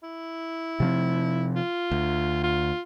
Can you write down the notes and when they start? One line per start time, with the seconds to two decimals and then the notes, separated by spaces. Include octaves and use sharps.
0.03 E4
0.80 C3 F3 C4
1.56 F4
1.91 D2
2.44 F4